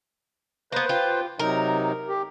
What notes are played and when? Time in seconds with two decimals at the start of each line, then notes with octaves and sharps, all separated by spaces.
0.72 A#3 B3 B4 C5
0.89 F4 G4
1.39 C3 F#3 D#4 A#4
2.08 G4